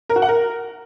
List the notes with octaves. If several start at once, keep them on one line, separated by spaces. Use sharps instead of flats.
A#4
F#4
F#5
A#4